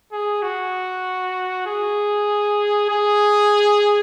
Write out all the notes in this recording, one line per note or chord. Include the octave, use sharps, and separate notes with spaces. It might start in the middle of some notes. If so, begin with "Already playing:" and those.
G#4
F#4
G#4
G#4